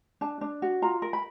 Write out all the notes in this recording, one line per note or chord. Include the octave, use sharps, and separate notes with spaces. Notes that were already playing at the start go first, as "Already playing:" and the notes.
D4 A5
D4
F#4
F4 A#5
A#4
B5